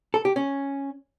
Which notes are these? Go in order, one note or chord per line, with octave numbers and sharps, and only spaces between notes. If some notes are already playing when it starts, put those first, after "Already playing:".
A4
G4
C#4